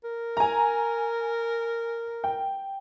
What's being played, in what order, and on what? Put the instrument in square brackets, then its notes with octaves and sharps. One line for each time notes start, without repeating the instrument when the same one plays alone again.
[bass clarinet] A#4
[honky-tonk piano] G#5 A#5
G5